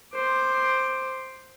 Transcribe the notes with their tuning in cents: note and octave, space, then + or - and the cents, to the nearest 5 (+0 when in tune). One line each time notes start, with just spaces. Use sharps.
C5 +0 D6 +10